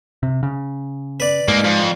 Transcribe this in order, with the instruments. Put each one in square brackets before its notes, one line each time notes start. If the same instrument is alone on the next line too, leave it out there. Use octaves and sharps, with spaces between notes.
[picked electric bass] C3
C#3
[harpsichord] B4 D5
[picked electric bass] G#2 [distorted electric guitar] A#3 D#4
[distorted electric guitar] F2